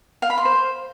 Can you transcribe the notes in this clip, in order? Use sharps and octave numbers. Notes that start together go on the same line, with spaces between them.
F5
B5
C6
C5